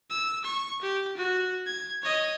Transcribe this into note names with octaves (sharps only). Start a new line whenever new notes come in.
E6
C#6
G4
F#4
G#6
C#5 D#5